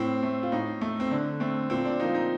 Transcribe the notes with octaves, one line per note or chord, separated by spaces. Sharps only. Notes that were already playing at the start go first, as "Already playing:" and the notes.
Already playing: A2 C4
A3
F4
A2 D#4
A3
C4
D3 D4
A3 C4
A#2 C4
D4
F3 A#3 D#4
D#4